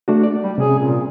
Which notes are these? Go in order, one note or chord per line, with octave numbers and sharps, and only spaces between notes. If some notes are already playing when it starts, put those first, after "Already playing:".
A3 D4 F#4
D5
G3
C3 C#4 G#4
A#2